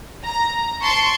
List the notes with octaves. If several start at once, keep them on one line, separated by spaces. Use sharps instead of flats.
A#5
A5 C6 C#6 D7